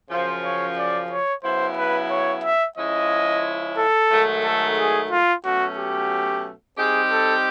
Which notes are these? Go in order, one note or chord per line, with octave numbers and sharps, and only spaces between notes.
F#2 C#3 F3 C5
C#5
D5
C#5
C#3 F#3 B3 E4 C5
B4
C#5
E5
C#3 F3 G#3 C#4 E4 D#5
A4
G#2 D#3 F#3 A3
A4
G#4
F4
B2 F#3 A3 C#4 F#4
G4
G3 C4 D#4 G4 G#4
A4